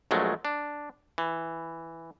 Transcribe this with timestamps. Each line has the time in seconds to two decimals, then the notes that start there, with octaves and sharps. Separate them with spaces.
0.11 A#1 F#3 G#3 A3
0.45 D4
1.18 E3